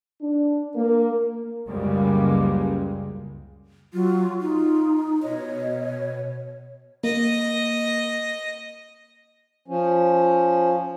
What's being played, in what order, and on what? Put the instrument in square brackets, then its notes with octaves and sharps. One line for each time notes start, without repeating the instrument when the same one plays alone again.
[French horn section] D4
A#3
[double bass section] C#2 F#2 C#3 G3 G#3 A#3
[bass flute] F#3 [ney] F4
[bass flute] D#4 [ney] F4
[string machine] B2 [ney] C#5 [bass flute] D#5
[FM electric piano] A#3 [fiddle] D#5
[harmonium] F3 C#4